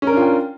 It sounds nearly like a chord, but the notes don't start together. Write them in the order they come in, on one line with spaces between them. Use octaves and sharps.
C#4 A#4 D4 F4 G5